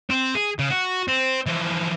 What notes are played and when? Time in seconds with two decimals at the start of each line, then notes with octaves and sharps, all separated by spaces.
0.10 C4
0.35 G#4
0.59 C#3
0.70 F#4
1.08 C4
1.46 E3 F3